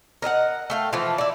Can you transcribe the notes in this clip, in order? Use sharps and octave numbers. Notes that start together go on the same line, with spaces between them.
A#4 D#5 E5 F#5
A3 F5 G5
E3 F3 A3 F4
E4 D5